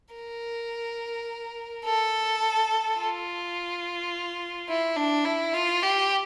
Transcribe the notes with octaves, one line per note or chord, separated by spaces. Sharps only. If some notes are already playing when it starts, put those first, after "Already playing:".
A#4
A4
F4
E4
D4
E4
F4
G4